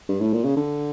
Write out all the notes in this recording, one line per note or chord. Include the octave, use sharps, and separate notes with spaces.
G2
A2
A#2
C#3
D3